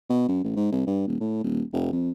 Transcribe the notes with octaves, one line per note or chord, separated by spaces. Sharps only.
B2
F#2
A1
G#2
C2
G2
D#1
A2
D#1
F1
F2